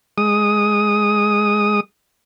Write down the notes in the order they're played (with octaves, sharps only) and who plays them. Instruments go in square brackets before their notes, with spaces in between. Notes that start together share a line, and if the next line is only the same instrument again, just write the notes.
[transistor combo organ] G#3 D#6